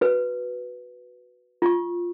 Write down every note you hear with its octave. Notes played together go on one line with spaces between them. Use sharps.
F#4 B4
F4 C#6